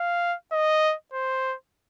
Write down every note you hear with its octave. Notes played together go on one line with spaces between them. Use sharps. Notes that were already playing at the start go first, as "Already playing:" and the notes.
Already playing: F5
D#5
C5